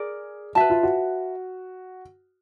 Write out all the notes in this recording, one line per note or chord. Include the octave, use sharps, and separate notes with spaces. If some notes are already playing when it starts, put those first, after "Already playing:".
Already playing: G#4 A#4 D5
F#4 B4 E5 A5
F4
F#4